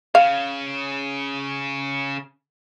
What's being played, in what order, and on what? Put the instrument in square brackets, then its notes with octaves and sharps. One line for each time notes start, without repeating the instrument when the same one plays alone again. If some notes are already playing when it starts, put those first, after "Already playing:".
[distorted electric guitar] C#3 [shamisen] F5